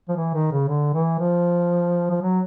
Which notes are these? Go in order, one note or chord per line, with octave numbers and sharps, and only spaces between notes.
F3
E3
D#3
C#3
D3
E3
F3
F3
F#3